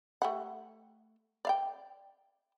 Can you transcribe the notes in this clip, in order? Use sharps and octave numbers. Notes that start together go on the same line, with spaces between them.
A3 G4 F#5
D5 F5 G5